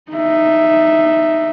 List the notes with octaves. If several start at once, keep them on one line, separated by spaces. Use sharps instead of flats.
D#4 E5